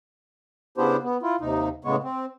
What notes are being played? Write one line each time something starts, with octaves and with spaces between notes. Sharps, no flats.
C#3 B3 D4 E4 G4 C5
B3
E4 F4
D#2 C3 D#4
A2 C#3 G#3 B3 C#5
C4